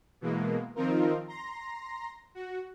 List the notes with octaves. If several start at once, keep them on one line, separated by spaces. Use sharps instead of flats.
B2 E3 G#3 A#3
D#3 F3 C4 D#4 F4 A#4
A#5 C6 A#6
F#4